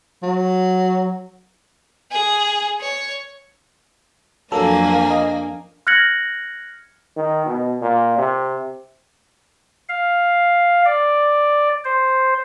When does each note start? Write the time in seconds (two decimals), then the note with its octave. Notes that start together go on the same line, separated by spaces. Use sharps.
0.23 F#3
2.11 G#4
2.81 C#5
4.52 F2 F#3 A#3 D4 A4 G#5
5.10 D#5
5.87 F6 F#6 G#6 A#6 C#7 F#7
7.17 D#3
7.46 B2
7.81 A#2
8.18 C3
9.89 F5
10.85 D5
11.85 C5